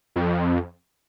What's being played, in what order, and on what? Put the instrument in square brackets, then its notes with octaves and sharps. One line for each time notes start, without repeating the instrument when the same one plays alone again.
[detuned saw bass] F2